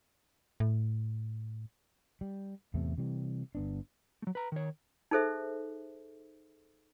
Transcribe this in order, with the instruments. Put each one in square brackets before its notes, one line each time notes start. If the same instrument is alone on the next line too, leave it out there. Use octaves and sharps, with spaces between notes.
[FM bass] A2
[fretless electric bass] G3
E2 A2 C3 A3
C3 E3 G3
G1 B3 D4
[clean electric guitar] F#3 A3
B4 A#5
D#3 C#5
[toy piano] D#4 G#4 A4 C5 E5